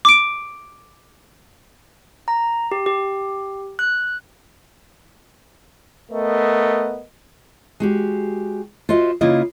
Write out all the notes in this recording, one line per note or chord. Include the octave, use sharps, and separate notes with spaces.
D6 D7
A#5
G4
G4
F#6
A3 B3 A#4 D#5
G#3 F#4 G4
F4 F#4 C5 D#5 E5
C#3 A#3 E4 F4 D#5